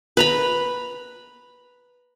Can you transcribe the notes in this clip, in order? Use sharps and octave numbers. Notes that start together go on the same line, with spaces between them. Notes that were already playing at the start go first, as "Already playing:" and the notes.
B4 A#5 B5